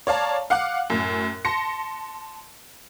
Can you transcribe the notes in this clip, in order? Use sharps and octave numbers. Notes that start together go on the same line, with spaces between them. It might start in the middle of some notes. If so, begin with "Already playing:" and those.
C#5 D5 F5 A5 A#5
F5 F#5 D6 F#6
F#2 A2
A5 C6 A#6 C#7